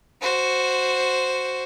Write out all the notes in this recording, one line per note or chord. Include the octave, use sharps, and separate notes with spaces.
F#4 C5